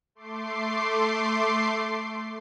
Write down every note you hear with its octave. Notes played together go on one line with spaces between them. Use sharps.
A3 C6 D6 C7